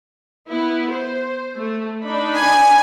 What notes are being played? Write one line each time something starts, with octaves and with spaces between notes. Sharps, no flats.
B3 E4
C5
A3
D4 D#4 B5
G#5